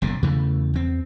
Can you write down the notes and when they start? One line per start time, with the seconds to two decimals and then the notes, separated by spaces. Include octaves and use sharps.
0.02 F#1 B1 A2 C#3
0.23 E2 C#3 E3 A3
0.74 E2 C4